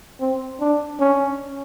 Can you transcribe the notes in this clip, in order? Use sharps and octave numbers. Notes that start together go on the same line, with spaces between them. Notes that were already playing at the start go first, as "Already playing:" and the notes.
C4
D4
C#4